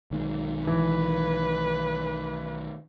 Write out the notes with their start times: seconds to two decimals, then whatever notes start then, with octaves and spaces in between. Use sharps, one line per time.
0.11 B1 D#3 G#3
0.67 E3 B4